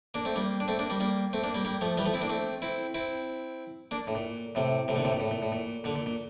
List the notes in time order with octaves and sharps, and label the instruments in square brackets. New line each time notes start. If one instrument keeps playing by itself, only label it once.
[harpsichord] A#3 D4
A3 C4
G3 A#3
D4
A3 C4
A#3 D4
G3 A#3
G3 A#3
A3 C4
A#3 D4
G3 A#3
G3 A#3
F3 A3
E3 G3
F3 A3
C4 E4
A#3 D4
A3 C4
C4 E4
C4 E4
A#3 D4
A2
A#2
A2 C3
A2 C3
A#2 D3
A2 C3
A#2
A2
A#2
A2
A#2
A#2 D3
A#2
A#2